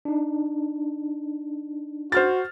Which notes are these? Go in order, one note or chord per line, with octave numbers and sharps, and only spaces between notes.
D4 D#4
F#4 C5 F6 A6